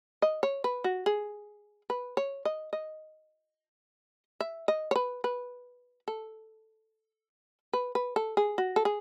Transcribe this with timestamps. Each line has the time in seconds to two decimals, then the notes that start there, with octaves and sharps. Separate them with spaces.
0.22 D#5
0.43 C#5
0.64 B4
0.84 F#4
1.06 G#4
1.90 B4
2.17 C#5
2.45 D#5
2.73 D#5
4.40 E5
4.68 D#5
4.91 C#5
4.96 B4
5.24 B4
6.08 A4
7.73 B4
7.95 B4
8.16 A4
8.37 G#4
8.58 F#4
8.76 A4
8.85 G#4